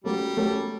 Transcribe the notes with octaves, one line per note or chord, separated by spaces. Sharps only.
F#3 G3 A3 C#4 G4
F#3 A3 C#4 G4